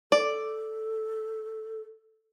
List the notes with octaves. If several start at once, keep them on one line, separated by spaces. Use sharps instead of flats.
A4 D5